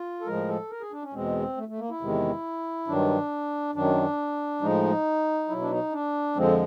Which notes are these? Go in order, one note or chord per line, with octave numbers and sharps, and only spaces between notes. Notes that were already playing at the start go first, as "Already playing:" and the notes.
Already playing: F4
A4
A2 F3 G#3 A#4
A4
A#4
G#4
D4
C#4
E2 B2 G#3 C4
A3
A3
A#3
E4
E2 C3 D#3 G#3
G2 D#3 F#3 D4
F#2 D#3 F#3 D4
A2 F3 G#3 D#4
B2 F#3 E4
D4
D#4
D4
F2 D3 F3 G#3 C4